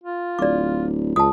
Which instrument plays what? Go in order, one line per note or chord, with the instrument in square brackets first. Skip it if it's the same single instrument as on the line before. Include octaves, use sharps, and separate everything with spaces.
[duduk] F4
[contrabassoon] D1 [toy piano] D5 D6
[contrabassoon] C#2 [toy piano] A5 D#6